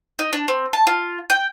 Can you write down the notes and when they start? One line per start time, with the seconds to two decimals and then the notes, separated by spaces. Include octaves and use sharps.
0.19 D#4
0.33 D4
0.48 C4
0.73 A5
0.87 F4
1.30 G5